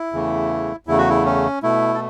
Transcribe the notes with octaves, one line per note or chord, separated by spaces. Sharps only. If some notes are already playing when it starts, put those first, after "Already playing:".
Already playing: E4
E2 C#3 E3 A3
E2 C#3 A3 E4
F#4
E4
C#4
B2 A3 E4
A4